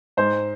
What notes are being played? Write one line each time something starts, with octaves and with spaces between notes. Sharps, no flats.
G#2 C5